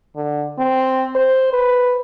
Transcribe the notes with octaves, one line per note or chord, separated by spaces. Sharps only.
D3
C4
C5
B4